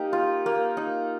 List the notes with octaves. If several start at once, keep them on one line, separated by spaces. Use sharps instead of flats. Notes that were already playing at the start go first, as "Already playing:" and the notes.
Already playing: A#3 D#4 G4
F4
A#3
D#4